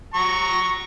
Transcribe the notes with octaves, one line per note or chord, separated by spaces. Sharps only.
A#5 C#6